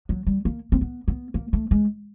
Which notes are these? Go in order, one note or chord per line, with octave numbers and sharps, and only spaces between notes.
F#3
G3
A#3
C4
B3
B3
A#3
A3
G#3